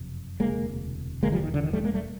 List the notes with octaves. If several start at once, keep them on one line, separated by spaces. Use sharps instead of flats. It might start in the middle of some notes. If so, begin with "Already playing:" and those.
Already playing: F#1 F2 C3
E1 D2 C3 G#3 A#3
E1 D2 D3 G#3 A#3
F3 G3
D#3
D3
D#3
G3 A3
G#3 A#3
G3 A3